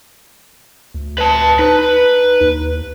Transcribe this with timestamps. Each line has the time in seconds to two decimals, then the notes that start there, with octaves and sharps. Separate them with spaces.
0.94 D2
1.18 B4 A5
1.59 D#4 B4
2.41 D#2